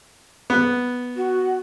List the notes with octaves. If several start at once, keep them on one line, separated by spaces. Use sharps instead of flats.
B3
F#4